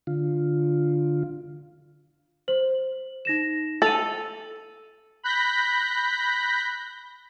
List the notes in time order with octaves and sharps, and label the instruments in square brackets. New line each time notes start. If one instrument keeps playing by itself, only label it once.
[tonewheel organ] D3 F4
[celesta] C5 F#7
D#4 A#6 E7
[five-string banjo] A4 [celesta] D#7 F7 F#7
[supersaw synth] B5 F#6 G6 A#6 B6